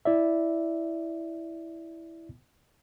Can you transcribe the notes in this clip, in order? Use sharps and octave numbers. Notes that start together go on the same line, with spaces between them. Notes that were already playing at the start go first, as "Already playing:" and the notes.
E4 D5 E5